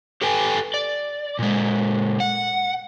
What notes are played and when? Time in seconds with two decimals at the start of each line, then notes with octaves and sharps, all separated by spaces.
0.21 G4 A4 B4 G5 G#5
0.74 D5
1.39 A#2 G#3
2.20 F#5